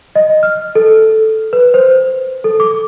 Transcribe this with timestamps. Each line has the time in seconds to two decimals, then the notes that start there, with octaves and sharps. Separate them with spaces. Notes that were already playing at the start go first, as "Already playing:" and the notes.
0.16 D#5
0.43 F6
0.75 A4
1.53 B4
1.74 C5
2.44 A4
2.60 D6